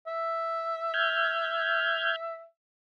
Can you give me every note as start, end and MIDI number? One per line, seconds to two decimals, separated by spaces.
0.07 2.43 76
0.94 2.16 89
0.94 2.16 91
0.94 2.16 92